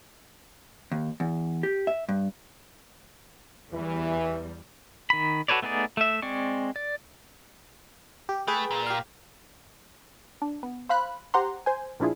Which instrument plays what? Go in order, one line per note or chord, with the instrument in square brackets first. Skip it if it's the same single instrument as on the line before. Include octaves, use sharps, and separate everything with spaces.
[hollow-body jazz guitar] D#2
E2
G4
E5
G2
[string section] E2 G3 [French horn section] E3
[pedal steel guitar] D#3 B5
F#4 A4 B4 C#5 D5
A3 B3 D#4 G#4 D5
A3 E5
G#3 C4 D5 C#6
D5
[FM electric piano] G4
[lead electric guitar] A3 [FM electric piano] G#4 B4 G5
[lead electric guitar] A#2
[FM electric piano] G4 F5
[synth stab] D4
B3
C5 F5 B5 F#6
G4 C5 F#5 A#5 C6
C5 G#5
A#2 F3 D4 E4 F4 G#4